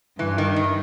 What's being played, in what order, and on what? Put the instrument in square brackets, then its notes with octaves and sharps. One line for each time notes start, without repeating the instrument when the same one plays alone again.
[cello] G2 [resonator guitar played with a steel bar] E3
[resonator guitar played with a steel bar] D#3
D#3